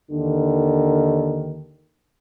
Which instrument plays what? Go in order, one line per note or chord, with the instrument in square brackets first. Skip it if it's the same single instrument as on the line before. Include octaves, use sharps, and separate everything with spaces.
[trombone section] D#2 D3 D#3